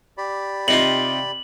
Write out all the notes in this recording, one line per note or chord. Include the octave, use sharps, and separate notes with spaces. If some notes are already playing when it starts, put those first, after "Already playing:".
G4 D5 B5
C3 D#4 F4 F#7